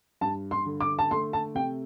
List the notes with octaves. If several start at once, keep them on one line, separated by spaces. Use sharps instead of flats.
G2 A5
C6
D3
D6
A5
A3 C6
A5
C3 G5